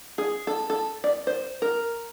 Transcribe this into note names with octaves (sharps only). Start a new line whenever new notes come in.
G#4
A4
A4
D5
C5
A#4